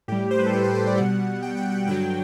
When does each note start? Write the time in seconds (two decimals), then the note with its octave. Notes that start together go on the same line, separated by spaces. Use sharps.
0.08 A2 G3 G4
0.31 C5
0.39 B4
0.46 A4
0.53 G4
0.64 C5
0.75 C5
0.87 D5
0.97 B2 G3 F#5
1.43 G5
1.57 G5
1.72 F#5
1.86 G2 D3 F#3 G5